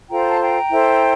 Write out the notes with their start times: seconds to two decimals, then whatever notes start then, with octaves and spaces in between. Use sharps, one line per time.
0.10 F4 A4 C5 G5 A#5
0.28 A5
0.40 G5 A#5
0.70 E4 A4 C5